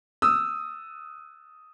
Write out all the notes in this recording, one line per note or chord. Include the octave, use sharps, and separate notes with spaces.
D#6 E6